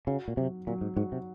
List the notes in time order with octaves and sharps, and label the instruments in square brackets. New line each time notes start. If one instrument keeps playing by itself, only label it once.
[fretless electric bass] C#3 [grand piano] F#4
[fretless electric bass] A#2
[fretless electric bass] C3 [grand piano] F#3
[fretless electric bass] A#2 [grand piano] F#3
[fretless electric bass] G#2
[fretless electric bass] G#2 [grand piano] F#4
[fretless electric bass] C3